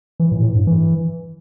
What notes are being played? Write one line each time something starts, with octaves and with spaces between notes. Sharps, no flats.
E3
A2
A2
G2
E3